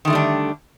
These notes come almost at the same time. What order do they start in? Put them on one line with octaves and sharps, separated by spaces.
D#3 D3 A3 G3 D4